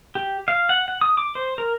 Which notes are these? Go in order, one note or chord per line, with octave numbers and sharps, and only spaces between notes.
G4
F5
F#5
F#5
D#6
D6
C5
A#4